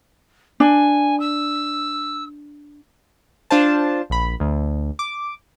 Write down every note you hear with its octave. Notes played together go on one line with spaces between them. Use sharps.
D4 G#5
E6
D4 F4 C5 A5
A#1 B5
D2
D6